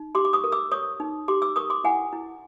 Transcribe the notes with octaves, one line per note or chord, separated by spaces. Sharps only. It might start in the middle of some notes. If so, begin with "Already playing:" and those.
Already playing: D#4
G4 C6 D6
D6
C#6 D#6
A#4
D6 E6
C#5 C#6 D#6
D#4
G4 C6 D6
D6 E6
A#4 C#6 D#6
C6 D6
E4 F#5 G#5
E4